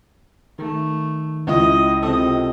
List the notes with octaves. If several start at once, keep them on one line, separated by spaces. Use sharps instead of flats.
D#3 A3
C#2 E4 D#5
C3 C4 A4 D#5